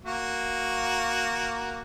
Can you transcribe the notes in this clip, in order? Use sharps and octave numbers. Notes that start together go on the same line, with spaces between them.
A#3 F#4